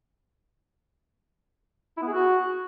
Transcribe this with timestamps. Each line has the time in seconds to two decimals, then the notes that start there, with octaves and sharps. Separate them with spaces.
1.97 E4
2.02 B3
2.07 G#4
2.12 F#4